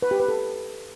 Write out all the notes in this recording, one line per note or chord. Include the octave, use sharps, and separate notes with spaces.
B4
G4
B4
A4